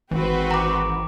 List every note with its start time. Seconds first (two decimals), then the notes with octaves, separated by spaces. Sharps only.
0.11 G#1 E3 C4 F#4 B4
0.51 A#5 D6